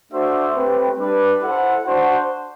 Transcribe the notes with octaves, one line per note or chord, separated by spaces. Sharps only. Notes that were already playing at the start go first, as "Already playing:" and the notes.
A3 D4 F#4 C5 E5
A3 C4 G4 B4
G3 D4 G4 B4
E4 A4 C5 F#5
D4 F#4 C5 F#5